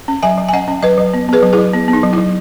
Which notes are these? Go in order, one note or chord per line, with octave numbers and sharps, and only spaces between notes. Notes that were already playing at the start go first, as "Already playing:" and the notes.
C#4
F#3 E5 G#5
F#3
G#5
C#4 D#5 F#5
C#4
F#3 B4 D#5
F#3
B3
B3 G#4 B4
F#3
E4 G#4
F#3
B3
B3
D#4
F#3
E4
F#3